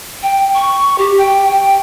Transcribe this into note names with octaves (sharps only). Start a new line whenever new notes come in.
G5
C#6
G4
G5
G5